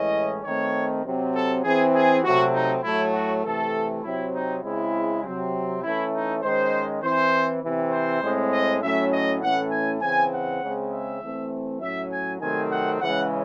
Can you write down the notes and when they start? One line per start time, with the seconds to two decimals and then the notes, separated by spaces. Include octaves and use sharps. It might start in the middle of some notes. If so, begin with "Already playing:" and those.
Already playing: A2 E3 G#3 C#4 D#5
0.44 D#3 A3 C4 C#5
1.04 C3 F#3 C4
1.34 A4
1.64 E3 C4 G#4
1.95 G#4
2.24 C3 F#3 A3 C4 F#4
2.53 D#4
2.83 A2 F#3 A3 E4
3.14 F#4
3.43 C3 E3 A3 A4
4.03 C3 F#3 C4 E4
4.34 D#4
4.63 C#3 G#3 C4 E4
5.23 C3 F#3 C4
5.82 E3 A3 C#4 E4
6.13 D#4
6.42 D#3 G#3 C#4 C5
7.02 E3 C4 C5
7.63 C3 E3 C4
7.92 C5
8.22 A2 G#3 C4
8.53 D#5
8.81 A2 F#3 A3 C#4 E5
9.12 D#5
9.41 A2 E3 A3 C#4 F#5
9.71 G#5
10.01 C#3 E3 C4 G#5
10.32 F#5
10.62 C#3 G#3 C4
10.92 E5
11.21 E3 A3 C4
11.81 A2 F#3 C#4 E5
12.11 G#5
12.41 C3 D#3 F#3 A3 C4 G#5
12.71 F#5
13.00 C#3 E3 G#3 C#4 F#5